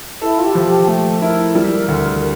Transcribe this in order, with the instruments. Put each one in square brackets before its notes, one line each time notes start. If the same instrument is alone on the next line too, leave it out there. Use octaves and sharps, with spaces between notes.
[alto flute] E4 [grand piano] A4
[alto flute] F4
G4
[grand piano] F3
[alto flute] G4
[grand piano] A3 [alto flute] A4
[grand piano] E4 [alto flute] A#4
[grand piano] G3
D2